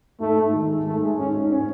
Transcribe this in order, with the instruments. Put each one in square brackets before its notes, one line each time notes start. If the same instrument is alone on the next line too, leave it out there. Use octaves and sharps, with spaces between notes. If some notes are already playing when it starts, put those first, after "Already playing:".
[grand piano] G#2 [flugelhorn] A3
[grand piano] G#2
D#3
G#3
[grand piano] G#2 [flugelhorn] A3
[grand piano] G#3
[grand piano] G#2 [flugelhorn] C#4
[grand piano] G#2
C#4